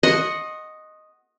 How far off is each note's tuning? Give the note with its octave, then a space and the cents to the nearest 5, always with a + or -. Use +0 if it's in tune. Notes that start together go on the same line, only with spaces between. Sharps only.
D#5 +0 F#5 +0 C6 +45